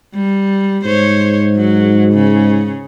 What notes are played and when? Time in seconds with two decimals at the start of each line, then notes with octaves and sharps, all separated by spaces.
0.15 G3
0.86 G#2 C5 C#5
1.57 F#3
2.14 C#3